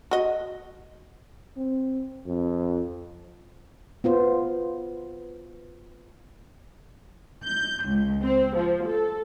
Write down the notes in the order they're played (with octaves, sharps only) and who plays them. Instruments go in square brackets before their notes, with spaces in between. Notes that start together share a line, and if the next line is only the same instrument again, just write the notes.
[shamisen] F#4 D#5
[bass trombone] C4
F2
[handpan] B3 F4 C5
[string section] G6
C#2
C4
F3
A4